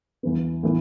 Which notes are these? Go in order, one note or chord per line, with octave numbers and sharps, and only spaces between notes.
E2 E3 B3
A2 E3 B3